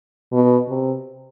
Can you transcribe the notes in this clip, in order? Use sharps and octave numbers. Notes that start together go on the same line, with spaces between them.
B2
C3